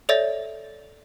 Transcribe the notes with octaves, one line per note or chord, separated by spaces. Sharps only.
A4 C#5 D5 E5 A6